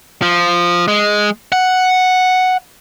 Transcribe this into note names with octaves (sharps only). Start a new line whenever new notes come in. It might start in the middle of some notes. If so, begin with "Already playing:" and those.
F3
G#3
F#5